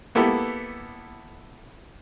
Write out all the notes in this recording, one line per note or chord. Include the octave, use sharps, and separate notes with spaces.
A#3 B3 E4 G4 A4 B4